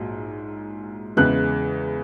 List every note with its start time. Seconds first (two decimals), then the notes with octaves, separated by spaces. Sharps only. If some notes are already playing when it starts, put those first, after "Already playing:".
Already playing: A#1 G#2 F#3
1.17 E2 C#3 E3 G#3 F#6